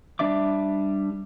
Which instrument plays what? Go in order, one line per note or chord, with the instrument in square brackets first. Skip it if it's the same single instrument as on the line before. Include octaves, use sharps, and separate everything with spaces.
[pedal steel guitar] G3 D4 D5 E5 D6